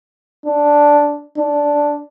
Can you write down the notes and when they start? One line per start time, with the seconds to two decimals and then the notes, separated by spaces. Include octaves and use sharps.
0.46 D4
1.37 D4